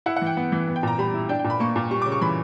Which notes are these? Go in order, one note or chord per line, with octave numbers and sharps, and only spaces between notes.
E4 F#5
F#5
E3
G5
B3
E3
B3
G5
A#2 A#5
G3 B5
E4
D4 G5
G5
A#2
B5
A#3 C#6
A#2
G3 C#6
C#3 D6
C#6
E3 B5